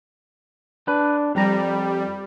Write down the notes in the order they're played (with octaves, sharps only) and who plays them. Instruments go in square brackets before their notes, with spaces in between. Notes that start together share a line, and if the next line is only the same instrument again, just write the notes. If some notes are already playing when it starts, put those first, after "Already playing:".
[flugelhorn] D4 [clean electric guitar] B4
[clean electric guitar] F2 A#5 [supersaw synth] G3 [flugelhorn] G4